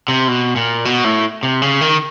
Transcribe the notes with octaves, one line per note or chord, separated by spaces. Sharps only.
C3
B2
A#2
B2
A2
C3
C#3
D#3